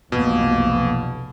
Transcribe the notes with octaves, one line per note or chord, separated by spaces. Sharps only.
F1 B1 B2 E3 A#3